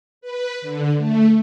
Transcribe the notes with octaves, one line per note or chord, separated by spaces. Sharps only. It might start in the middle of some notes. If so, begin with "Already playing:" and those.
B4
D3
A3